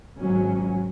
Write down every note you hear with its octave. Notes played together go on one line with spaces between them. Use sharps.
G#1 F#3 C#4